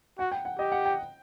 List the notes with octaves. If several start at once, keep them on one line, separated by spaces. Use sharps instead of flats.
F#4 F#5
G5
F#5
G4 D#5
F#5
G5